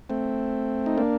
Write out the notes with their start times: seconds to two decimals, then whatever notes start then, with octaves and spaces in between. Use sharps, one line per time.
0.10 A3 C4
0.86 D#4
0.98 A#3 D4